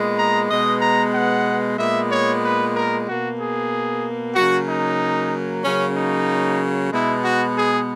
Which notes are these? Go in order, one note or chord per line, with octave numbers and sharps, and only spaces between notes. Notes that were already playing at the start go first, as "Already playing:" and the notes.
Already playing: A#2 G#3 B3
A#5
B2 G#3 B3 D#5
A#5
F#5
A#2 G#3 B3 E5
C#5
B4
A#4
B2 A#3 F#4
G#4
C#3 F#3 A#3 F#4
D#4
C#3 F#3 A#3 C#4
D#4
B2 G#3 B3 E4
F#4
G#4